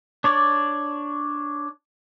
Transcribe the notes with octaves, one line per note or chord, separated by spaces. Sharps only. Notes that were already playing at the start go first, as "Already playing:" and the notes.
D4 C#5 D5